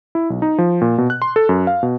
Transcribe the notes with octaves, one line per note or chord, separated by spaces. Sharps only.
E4
B1
D#4
F3
A#2
B2
F#6
C6
A4
F#2
F5
B2